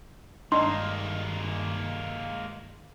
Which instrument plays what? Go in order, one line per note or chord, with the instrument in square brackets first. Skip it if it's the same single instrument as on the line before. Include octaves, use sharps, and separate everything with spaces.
[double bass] G2 D#3 [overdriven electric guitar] G#3 A#3 [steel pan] D4 D#4 [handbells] C6